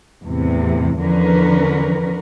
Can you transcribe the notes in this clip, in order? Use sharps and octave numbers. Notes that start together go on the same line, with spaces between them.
E2 A2 C3
E2 D3 F3 C#4 A#4 B4